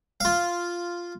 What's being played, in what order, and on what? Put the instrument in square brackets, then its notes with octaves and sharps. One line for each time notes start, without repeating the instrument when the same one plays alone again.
[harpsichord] F4 F5